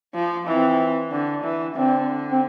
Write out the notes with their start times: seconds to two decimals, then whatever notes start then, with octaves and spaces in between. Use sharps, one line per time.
0.14 F3
0.47 E3 C4
1.11 D3
1.44 E3
1.75 D3 C4
2.32 C4